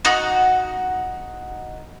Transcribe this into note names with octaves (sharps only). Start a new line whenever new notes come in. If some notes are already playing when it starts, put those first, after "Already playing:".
D#4 F#4